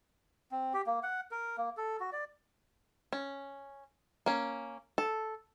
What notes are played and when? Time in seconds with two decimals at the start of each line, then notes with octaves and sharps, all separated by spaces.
0.51 C4
0.74 G4
0.87 A#3
1.03 F#5
1.31 A#4
1.58 A#3
1.77 A4
2.00 F#4
2.12 D5
3.13 C#4
4.26 A#3 C#4
4.98 A4